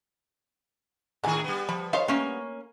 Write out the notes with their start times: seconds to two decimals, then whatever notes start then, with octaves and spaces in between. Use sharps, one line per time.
1.24 A2 D3 D#3 G#4 G#5
1.44 G3 B3
1.69 F3 B5
1.93 D#4 C5 C#5 F5
2.08 A3 A#3 C#4